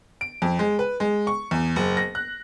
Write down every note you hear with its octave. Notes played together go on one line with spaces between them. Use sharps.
D7
F2
G#3
B4
G#3
C#6
E2
F#1
A#6
F#6